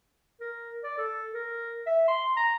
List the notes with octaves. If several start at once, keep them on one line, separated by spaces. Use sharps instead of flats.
A#4
D5
A4
A#4
E5
C6
A#5